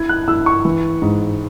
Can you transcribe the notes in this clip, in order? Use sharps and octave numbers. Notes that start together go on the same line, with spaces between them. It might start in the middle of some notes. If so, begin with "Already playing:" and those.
Already playing: E4 G#6
F#6
E4 E6
C#6
E3
G#2